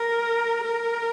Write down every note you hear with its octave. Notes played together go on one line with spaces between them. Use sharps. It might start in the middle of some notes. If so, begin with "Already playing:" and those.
Already playing: A#4
A#4